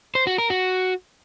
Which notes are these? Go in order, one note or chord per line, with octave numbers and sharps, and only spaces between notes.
C5
F#4
A#4
F#4